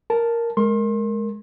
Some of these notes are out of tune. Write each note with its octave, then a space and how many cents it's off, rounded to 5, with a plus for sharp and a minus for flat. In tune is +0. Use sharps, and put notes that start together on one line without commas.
A#4 +0 A5 +0
G#3 +15 A#4 -5 C6 +35